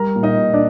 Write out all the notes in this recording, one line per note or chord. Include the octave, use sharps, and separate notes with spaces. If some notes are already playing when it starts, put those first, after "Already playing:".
Already playing: G3 A#4 A#5
A#2
D#4 D#5
A#2
D4 D5